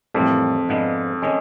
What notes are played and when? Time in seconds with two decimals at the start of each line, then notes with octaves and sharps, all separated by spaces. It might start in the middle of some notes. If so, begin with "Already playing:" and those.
0.14 F2 A2 E3 G3 A#3
0.69 G#2 F3 G#3 B3 D4
1.22 D#3 G#3 C#4